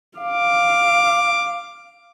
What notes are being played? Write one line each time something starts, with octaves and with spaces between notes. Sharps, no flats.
F5 D6